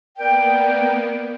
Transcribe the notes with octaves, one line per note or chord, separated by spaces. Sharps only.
A#3 B3 A#4 D5 G5